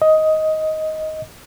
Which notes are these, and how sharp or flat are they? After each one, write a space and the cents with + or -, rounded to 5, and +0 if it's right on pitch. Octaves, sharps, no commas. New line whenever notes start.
D#5 +10